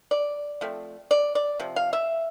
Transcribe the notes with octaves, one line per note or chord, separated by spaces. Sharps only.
D5
F3 A3 C4
D5
D5
C3 F3
F5
E5